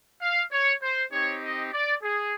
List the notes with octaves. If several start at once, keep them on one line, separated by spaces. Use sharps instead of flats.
F5
C#5
C5
C4 D#4 G4 C#5
D#5
D5
G#4